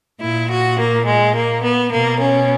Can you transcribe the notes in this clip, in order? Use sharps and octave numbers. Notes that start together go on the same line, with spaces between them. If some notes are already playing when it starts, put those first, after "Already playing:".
A#2 E4
F#4
A#3
G#3
A#3
B3
B2 A#3
C#4